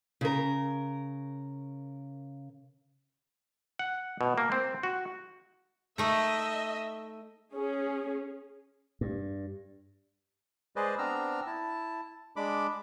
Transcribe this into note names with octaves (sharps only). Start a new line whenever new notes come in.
C#3 A#4
F#5
B2
A#3
C4
F#4
A3 D#4 D#5 E5
C#4 G#4
G2
G#3 G#4 B4 C5 D5 D#5
B3 C4 D4 A#5 E6 F6
E4 A5
G#3 D4 B5 D6